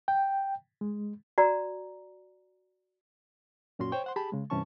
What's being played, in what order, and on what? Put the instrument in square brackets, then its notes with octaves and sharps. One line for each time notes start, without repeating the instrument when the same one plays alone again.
[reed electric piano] G5
G#3
[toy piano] F#4 D5 A#5
[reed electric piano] F#2 A#2 C#4 F#4 C6
C5 C#5 G5 C#6
C5 F#5 C6
G4 G#4 A5 B5
C#3 G#3
G2 C3 E3 C#4 A5 C#6